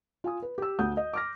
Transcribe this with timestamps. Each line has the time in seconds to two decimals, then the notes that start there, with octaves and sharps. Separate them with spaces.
0.24 F4 G#5 D#6
0.42 B4
0.58 G4 E6
0.79 D2 F#5 D#6 G6
0.97 D#5
1.13 D6 F6 A#6